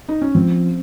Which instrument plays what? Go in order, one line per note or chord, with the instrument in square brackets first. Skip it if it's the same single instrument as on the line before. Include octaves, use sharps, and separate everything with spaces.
[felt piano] D#4
C#4
[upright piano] F3 [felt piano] C4